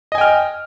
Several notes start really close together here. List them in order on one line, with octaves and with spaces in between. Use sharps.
D#5 G#5 G5 F6